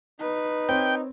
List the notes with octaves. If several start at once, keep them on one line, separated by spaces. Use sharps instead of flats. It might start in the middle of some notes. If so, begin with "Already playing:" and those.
D#4 B4
C4 C#5 G5